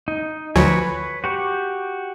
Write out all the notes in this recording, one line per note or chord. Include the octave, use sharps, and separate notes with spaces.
D#4
D2 F3 F#3 B4 C#5 G#5
F#4 G4 C#6